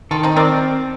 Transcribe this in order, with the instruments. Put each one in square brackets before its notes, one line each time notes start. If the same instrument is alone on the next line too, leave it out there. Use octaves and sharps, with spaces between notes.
[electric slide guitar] D#3 [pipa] F4 A4
[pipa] C4 D#4
[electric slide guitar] C4 [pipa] A#4 D5